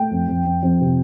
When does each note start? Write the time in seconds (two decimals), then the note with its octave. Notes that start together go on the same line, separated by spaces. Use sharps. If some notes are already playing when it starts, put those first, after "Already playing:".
Already playing: A3 G5
0.11 F2
0.27 F2
0.45 F2
0.63 F2
0.81 C3